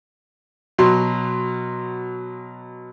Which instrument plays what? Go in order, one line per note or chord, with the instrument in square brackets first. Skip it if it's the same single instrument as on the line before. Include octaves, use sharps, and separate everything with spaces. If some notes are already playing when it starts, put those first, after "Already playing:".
[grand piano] B2 F#3 C6